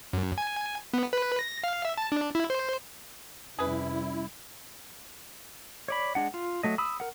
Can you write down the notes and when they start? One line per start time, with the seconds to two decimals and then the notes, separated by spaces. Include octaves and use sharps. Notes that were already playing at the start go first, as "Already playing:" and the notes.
0.13 F#2
0.38 G#5
0.94 B3
1.13 B4
1.39 A#6
1.64 F5
1.85 E5
1.98 A5
2.12 D4
2.35 E4
2.50 C5
3.59 F2 C3 G3 C#4 E4 G#4 B4
5.88 C#5 D5 B5
6.15 G#3 D4 F#5
6.34 F4
6.63 F#3 A3 D#5
6.78 B5 D#6 E6
7.00 A#4 F#5